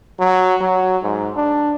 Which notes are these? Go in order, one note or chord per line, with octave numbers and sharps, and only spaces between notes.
F#3
F#3
G#2
D4